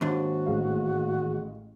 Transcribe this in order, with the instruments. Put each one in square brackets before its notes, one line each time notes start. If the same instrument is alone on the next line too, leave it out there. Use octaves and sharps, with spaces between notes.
[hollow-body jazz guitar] D#2 G#2 D4 [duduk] F#4
[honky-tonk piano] A1 G#3 F5